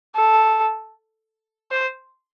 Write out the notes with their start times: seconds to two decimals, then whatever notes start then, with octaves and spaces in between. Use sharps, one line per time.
0.16 A4
1.71 C5